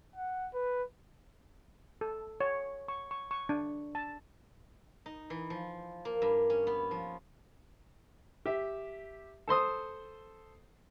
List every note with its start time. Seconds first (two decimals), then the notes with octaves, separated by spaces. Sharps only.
0.16 F#5
0.54 B4
2.01 A4
2.40 C#5
2.88 C#6
3.11 C#6
3.31 C#6
3.49 D4
3.95 A5
5.06 D#4
5.30 E3
5.50 F3
6.05 A#3
6.22 G2
6.50 C#4
6.67 B3
6.91 F3
8.45 G4 E5
9.48 A4 C5 C6 D#6